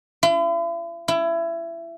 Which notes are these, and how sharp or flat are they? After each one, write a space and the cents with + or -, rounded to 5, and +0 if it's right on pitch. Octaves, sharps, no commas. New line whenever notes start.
E4 +45
E4 +25